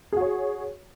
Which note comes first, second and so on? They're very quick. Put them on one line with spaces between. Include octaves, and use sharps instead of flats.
G#4 F#4 C#5